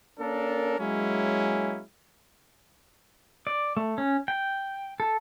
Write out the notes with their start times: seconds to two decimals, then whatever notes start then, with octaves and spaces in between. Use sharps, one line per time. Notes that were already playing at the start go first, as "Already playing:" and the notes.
0.19 A#3 C#4 D4 A4 A#4
0.79 F#3 G#3 A#3 C#4 E4
3.47 D5
3.77 A3
3.98 C#4
4.28 G5
5.00 A4